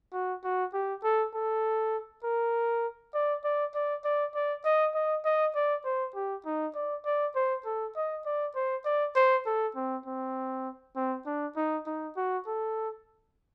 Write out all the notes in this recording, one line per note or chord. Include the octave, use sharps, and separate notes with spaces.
F#4
F#4
G4
A4
A4
A#4
D5
D5
D5
D5
D5
D#5
D#5
D#5
D5
C5
G4
D#4
D5
D5
C5
A4
D#5
D5
C5
D5
C5
A4
C4
C4
C4
D4
D#4
D#4
F#4
A4